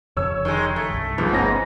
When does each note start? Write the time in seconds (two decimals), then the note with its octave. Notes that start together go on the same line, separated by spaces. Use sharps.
0.17 F1 F2 C#3 C#5 E6
0.45 D#3 G#3
0.76 A3
0.90 C2 G2
1.18 C#2 G#2 F3
1.32 G1 A3 B3 C#4 A#6